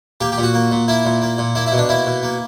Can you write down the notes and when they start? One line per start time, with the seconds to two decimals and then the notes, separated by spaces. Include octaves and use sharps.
0.21 A#3 G4
0.32 G4
0.38 A#2
0.43 F#4
0.54 A#3
0.72 A#2
0.88 A#3 E4
1.05 A#2
1.22 A#3
1.38 A#2
1.55 A#3 E4
1.66 E4
1.72 B2
1.78 D4
1.89 A#3 E4
2.06 B2
2.23 A#3